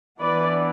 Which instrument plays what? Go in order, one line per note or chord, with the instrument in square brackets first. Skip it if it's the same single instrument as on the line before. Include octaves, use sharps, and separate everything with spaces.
[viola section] E3 B3 D4 B4 D5